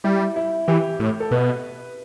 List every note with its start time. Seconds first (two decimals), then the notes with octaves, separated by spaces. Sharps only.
0.04 G3 E4
0.36 E4
0.68 E3 G4
1.00 A2
1.20 A4
1.31 B2 B4